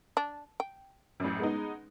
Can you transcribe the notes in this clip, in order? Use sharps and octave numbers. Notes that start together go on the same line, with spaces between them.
D4
G5
A1 F#2
G#3 B3 D#4